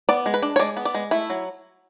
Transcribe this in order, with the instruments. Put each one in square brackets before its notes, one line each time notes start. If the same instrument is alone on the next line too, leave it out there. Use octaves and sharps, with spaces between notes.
[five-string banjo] B3 D5
G#3
B4
D4
C#5
G#3 D5
B3
D5
G#3
A3 E4
F#3